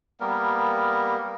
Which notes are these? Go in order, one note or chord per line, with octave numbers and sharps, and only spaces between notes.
G3 A#3 B3 A#4